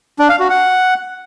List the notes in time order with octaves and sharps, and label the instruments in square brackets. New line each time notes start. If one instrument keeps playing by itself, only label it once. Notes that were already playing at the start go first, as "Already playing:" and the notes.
[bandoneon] D4
F5
F#4
F#5